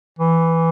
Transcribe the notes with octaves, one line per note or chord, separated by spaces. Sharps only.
E3